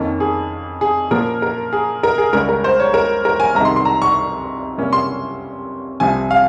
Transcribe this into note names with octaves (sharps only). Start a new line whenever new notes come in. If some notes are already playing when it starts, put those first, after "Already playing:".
Already playing: F2 D#3 A#3 C#4
G#4
G#4
A#2 F3 A#3 C#4 A#4
A#4
G#4
A#4
G#4
C#2 C#3 G3 C#4 A#4
A#4
C5
C#5
A#4
A#4
G#5
C2 C3 D#3 G#3 A#5
C6
C6
A#5
C#6
C3 G3 A#3 C#4
C6
C2 C3 F3 C4 G#5
F5